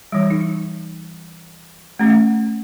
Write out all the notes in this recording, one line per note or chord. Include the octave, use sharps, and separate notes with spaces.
E3 G3
D#4
A3 C#4